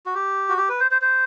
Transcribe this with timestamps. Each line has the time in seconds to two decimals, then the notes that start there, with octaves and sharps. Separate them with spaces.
0.06 F#4
0.15 G4
0.49 F#4
0.58 G4
0.69 B4
0.80 C5
0.91 C5
1.02 C5